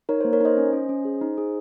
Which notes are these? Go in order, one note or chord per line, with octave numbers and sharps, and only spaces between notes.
D#4 A#4 C#5
A#3 C5
A#4 C#5
D#4 C5 D#5
C#4
C#4
C#4
G#4
D#4
G#4